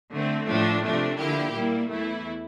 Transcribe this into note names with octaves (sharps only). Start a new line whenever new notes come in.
D3 A3 C4
A2 F3 A3 D4
C3 F3 A3 D4
D3 F3 A#3 E4 G4
A#2 G3 A#3 E4
E2 E3 A3 E4